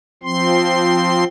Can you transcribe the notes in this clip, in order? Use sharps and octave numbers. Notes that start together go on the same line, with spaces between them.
F3 C4 C6